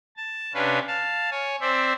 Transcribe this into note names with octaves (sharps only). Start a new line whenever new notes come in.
A5
C3 C#4 D4 B4 F5
F5 A5
C#5 G#5
C4 C5 D5 E5